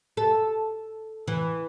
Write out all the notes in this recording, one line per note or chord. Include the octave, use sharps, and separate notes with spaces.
A4
E3